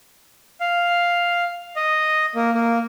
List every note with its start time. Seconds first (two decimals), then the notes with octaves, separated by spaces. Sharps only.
0.61 F5
1.76 D#5
2.35 A#3
2.55 A#3